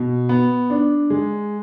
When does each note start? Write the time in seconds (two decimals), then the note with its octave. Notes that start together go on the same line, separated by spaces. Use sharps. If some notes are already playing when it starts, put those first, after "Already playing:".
Already playing: B2
0.29 B3
0.70 D4
1.10 G#3